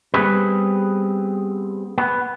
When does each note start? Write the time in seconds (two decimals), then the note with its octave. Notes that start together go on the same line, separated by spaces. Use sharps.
0.14 G3 B3 C4 G#4 B4
1.98 B3